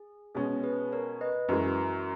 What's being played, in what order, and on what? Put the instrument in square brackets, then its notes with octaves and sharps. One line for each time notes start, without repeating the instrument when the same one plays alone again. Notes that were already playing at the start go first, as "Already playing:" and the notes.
Already playing: [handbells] G#4
[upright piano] B2 G#3 C#4 [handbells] G#4
[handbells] G#4 B4
A#4 C#5
B4 D#5
[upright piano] F#2 E3 G#3 [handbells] F#4 A#4